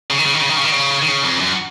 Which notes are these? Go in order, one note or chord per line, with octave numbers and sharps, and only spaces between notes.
C#3
D#3
C#3
D#3
C#3
D#3
C#3
D#3
C#3
D#3
C#3
F2
F#2